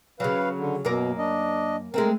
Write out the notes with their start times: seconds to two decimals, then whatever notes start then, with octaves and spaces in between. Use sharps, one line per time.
0.20 C#3 F#3 B4 F5
0.57 D3
0.85 F#2 B2 A#3 A#4
1.18 D4 D#5
1.94 G#3 A3 C4 A#4